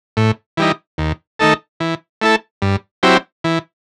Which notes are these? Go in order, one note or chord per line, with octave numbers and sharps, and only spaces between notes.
A2
E3 G3 D#4
D#2
D#3 A3 D#4 A4
E3
A3 E4 A4
G2
F#3 C4 E4 G4
E3